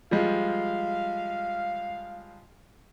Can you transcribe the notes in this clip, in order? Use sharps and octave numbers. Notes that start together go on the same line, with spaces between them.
F3 G3 G#3 F5